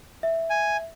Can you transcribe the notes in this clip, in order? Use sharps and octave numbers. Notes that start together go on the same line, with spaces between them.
E5
G#5